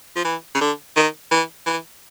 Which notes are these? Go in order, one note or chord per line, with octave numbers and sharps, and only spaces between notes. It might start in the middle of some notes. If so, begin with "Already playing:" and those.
F3
E3
C#3
D3
D#3
E3
E3